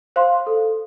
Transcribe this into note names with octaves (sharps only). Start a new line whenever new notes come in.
C5 F5 C6
A4